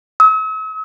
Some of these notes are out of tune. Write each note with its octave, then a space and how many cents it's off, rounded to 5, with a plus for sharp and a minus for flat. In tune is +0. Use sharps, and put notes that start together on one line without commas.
E6 -45